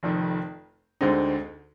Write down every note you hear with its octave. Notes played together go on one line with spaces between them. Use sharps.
F1 F2 D#3
D2 D3 G#3 C4 D#4